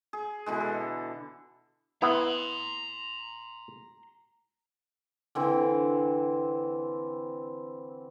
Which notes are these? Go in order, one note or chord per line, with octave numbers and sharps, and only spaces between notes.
G#4
B2 D3 E3 G#3
A4
B3 E4 A#5 C6
D3 E3 C4